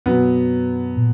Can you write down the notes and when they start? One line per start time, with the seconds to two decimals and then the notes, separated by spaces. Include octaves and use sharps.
0.06 F#2 B2 F#3 B3
0.96 A#2